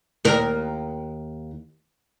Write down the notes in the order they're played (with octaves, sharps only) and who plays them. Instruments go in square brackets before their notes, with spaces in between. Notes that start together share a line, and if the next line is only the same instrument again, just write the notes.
[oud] D#2 A#4